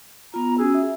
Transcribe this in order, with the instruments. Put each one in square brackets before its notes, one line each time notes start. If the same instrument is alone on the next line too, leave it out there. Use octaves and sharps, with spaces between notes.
[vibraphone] B3 F4 [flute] A#5
[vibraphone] C#4 F#4 E6 [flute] G#4
[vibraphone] E5